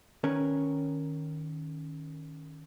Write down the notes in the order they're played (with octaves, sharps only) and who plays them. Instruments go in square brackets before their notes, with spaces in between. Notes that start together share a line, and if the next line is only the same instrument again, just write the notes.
[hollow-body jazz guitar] D#3 C#4 A#4 B4 C#5